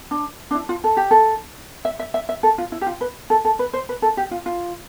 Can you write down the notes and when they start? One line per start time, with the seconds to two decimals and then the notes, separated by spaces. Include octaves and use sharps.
0.11 D4
0.51 D4
0.55 E4
0.69 F4
0.84 A4
0.97 G4
1.11 A4
1.85 E5
1.99 E5
2.14 E5
2.29 E5
2.43 A4
2.58 F4
2.72 E4
2.81 G4
2.87 F4
3.01 B4
3.30 A4
3.45 A4
3.59 B4
3.73 C5
3.89 B4
4.02 A4
4.17 G4
4.31 F4
4.46 F4